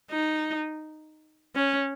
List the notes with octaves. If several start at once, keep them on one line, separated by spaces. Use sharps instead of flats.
D#4
C#4